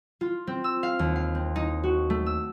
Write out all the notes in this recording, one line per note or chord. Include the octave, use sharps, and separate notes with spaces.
F4
C4
E6
F5
D#2
F5
C4
D#4
F#4
A3
E6